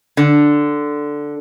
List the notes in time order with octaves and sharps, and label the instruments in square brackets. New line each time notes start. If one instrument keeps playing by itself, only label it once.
[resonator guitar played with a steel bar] D3